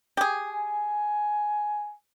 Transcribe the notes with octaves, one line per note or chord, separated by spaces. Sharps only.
G4 G#4
G#5